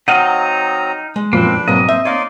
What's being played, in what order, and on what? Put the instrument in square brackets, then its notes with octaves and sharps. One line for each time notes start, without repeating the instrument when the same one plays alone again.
[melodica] F#3 C4 A#5 [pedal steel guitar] D#4 D#5 F5 [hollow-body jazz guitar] F#5
[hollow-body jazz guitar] G#3
[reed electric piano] F#2 A#2 F3 [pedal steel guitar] A#3 C4 [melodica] D4 B4
[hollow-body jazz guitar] B1 G#2 F#3 [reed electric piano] A#3 C4 [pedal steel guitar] D#5
[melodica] C5 [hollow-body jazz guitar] E5
[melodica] D#4 D5 C6 [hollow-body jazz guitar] C#5 F5